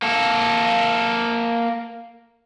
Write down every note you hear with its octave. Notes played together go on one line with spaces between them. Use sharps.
A#3 A4